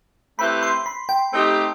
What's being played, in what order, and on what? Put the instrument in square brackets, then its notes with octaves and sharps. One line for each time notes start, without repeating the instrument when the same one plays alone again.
[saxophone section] A3 C4 E4 G4 B4 [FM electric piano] B5
[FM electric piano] C6
B5
G5
[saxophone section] A3 C4 D#4 G4